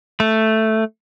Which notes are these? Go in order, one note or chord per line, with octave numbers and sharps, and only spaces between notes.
A3